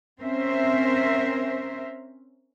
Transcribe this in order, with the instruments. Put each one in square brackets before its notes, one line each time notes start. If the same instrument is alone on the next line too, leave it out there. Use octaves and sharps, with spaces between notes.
[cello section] C4 C#4 A#4 C5 E5